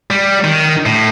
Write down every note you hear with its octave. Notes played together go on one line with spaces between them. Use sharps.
G3
D#3
A2